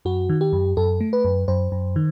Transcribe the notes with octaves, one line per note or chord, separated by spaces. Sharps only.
F#2 F#4
D#3
G4
F#2
F#2 A4
A3
B4
F#2
F#2 C5
F#2
D#3